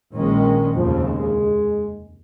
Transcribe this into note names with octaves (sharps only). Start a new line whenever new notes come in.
A#1 A#2 D#3 G#3 C#4
F1 D#2 C#3 F3
G#3